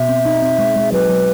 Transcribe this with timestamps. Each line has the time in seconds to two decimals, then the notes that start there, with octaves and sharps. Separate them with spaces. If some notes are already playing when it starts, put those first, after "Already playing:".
Already playing: B2 E5
0.09 C4
0.26 D#4
0.42 C4
0.59 G#3
0.76 G#3
0.92 F#3 B4
1.09 F#3